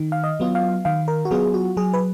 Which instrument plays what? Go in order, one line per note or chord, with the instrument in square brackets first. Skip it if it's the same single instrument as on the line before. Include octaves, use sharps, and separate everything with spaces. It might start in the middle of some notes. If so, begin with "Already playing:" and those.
Already playing: [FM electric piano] D#3
F5
D#5
F#3 B3 F4
F5
D#3 F5
A#4
F#4
F#3 B3 F4 G#4
F#4
F#3 G#4
B4